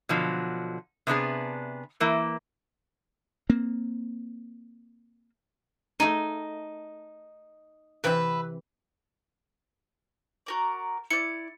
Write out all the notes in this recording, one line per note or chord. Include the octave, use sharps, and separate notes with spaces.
B2 D3 F3 F#3
C3 B3 D4 G#4
E3 A#3 E4
A#3 C4
A3 D#4 G#4 D#5
C3 E3 C4 B4 E5
F#4 A#4 D5
E4 D5 C#7